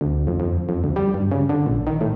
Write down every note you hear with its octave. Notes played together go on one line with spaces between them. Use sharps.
D2
F2
F2
F2
D2
G3
G2
C#3
D3
A#1
D#3
A2